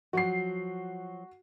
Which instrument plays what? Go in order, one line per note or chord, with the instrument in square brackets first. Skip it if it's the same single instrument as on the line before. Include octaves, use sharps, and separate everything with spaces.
[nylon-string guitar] F3 F#3 [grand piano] F#4 C7